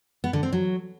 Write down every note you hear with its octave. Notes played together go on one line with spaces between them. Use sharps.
B3
D3
C4
F#3